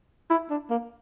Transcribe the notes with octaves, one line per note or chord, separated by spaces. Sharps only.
E4
D4
A#3